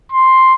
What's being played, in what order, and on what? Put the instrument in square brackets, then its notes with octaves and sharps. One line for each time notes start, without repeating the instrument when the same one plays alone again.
[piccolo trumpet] C6